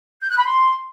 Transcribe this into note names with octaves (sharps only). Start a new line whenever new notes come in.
G6
F#6
B5
C6